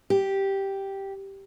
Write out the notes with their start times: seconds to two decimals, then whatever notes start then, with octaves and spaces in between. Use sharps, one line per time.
0.10 G4